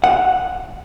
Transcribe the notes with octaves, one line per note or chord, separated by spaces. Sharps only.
F#5